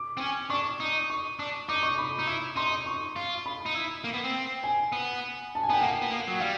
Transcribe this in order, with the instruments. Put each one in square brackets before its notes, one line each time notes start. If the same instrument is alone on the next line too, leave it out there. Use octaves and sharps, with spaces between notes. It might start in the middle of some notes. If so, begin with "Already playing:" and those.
Already playing: [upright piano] D6
[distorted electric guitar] C4
C#4
[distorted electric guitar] D4 [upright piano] C#6
[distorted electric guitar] D#4
[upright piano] C#6
[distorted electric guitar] D4
[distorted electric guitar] D#4 [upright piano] D6
[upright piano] C#6
B5
[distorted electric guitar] D#4
E4
[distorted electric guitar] D#4 [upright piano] C6
[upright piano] C#6
[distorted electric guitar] F4
[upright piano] B5
[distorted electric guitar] D#4
E4
A#3
B3
C4
[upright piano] G#5
[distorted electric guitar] B3
[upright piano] A5
G#5
[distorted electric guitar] B3 [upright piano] G5
[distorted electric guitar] A#3 [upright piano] F#5
[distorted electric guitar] B3
A#3
F#3
[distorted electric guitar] G3 [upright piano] F5